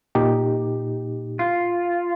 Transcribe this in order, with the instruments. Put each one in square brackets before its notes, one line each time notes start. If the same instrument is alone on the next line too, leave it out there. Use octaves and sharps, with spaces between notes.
[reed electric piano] A#2 D#4 G4
[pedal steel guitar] F4